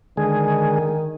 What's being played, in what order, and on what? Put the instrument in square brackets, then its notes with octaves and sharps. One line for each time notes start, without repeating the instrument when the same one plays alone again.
[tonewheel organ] D3 G#3 G#4 [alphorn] D#3